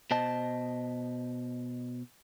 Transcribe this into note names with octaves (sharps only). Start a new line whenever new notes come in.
B2 C5 D#5 A5